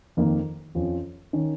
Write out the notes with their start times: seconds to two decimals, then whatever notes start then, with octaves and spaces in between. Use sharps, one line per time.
0.17 F2 D#3 A#3 D#4 A#4
0.75 F2 F3 C#4
1.33 D#3 C#4